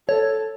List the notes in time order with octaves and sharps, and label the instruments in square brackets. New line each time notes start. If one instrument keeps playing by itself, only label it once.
[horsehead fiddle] A4 [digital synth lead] C#5